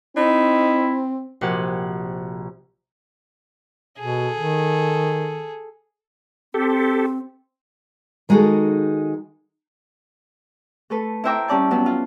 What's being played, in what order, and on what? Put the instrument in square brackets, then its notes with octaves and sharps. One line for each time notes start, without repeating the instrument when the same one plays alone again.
[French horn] C4 [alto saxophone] D#4 [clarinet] E4
[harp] A#1 C3 F#4 G4 F#5 G#5
[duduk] B2 [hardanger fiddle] G#4 A4
[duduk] D#3
[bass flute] C4 [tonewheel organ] G4 A4
[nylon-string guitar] D#3 G#3 D#4 F#4 G#4 A4
[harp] A3 A4 B4
E4 C5 E5 G5 A#5 D6
G3 C#4 D5 A5
F#3 B3 C#4
F4